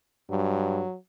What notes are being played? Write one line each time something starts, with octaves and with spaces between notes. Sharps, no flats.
G2 F#3